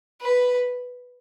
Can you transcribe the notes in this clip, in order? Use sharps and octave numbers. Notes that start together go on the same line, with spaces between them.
B4